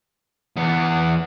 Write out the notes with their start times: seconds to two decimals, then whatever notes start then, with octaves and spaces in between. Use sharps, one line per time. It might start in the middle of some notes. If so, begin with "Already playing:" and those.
0.57 E2 B3